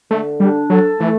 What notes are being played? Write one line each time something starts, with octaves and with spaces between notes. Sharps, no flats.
D3 A3
G3 D4
F#3 A4
E3 A3